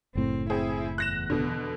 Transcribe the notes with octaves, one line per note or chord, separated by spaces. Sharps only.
F#1 A2 C4
C4 E4 G#4
E2 F#6 A#6 E7
B2 D3